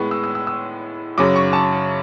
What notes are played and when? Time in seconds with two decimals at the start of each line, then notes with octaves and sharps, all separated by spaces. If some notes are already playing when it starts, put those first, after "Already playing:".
Already playing: A2 G#3 B3 C#6
0.11 E6
0.24 E6
0.35 E6
0.47 E6
1.18 F#2 C#3 F#3 D6
1.36 C#6
1.53 A5